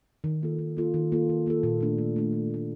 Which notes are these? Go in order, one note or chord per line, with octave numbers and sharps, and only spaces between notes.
D#3
A#3 F4 A4
D#3
A#3 F4 A4
D#3
A#3 F4 A4
D#3
A#3 F4 A4
A#2
A3 D4
A#2
A3 D4
A#2
A3 D4